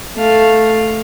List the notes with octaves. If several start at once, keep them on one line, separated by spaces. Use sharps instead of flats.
A3 F5